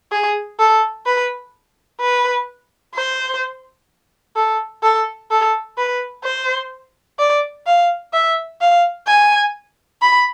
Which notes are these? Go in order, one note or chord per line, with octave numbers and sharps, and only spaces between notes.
G#4
A4
B4
B4
C5
A4
A4
A4
B4
C5
D5
F5
E5
F5
G#5
B5